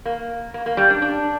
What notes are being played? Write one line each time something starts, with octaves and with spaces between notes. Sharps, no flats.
A#3
A#3
A#3
G3
D4
D4